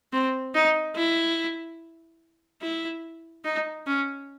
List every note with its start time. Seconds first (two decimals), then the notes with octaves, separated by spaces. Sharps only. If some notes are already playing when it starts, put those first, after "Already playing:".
0.13 C4
0.54 D#4
0.96 E4
2.62 E4
3.44 D#4
3.87 C#4